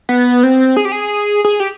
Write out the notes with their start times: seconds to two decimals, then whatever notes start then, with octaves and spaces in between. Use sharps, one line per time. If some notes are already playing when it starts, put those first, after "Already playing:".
0.09 B3
0.43 C4
0.77 G#4
0.85 G4
0.92 G#4
1.45 G#4
1.60 G4